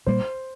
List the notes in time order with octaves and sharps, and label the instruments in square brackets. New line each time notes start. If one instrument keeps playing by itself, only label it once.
[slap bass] A#2 G3 A#3 [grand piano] C5